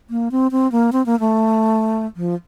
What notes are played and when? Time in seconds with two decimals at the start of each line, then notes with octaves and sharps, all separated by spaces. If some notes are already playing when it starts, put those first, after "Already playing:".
0.10 A#3
0.31 C4
0.52 C4
0.72 A#3
0.93 C4
1.06 A#3
1.20 A3
2.16 F3